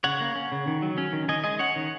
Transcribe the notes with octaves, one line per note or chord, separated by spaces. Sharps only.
C#3 C#5 F#5
A#3
C#4
C#3
D#3
F#3
C#4
D#3
D#3 D#5 G#5
G#3 D#5 G#5
C#4 C#5 F#5
D#3